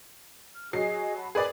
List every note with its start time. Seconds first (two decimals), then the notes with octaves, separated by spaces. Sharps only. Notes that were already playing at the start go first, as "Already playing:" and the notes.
0.54 F6
0.73 F#3 G#4 D#5 C7
1.16 F#5 A5 B5
1.35 G#4 A#4 B4 D5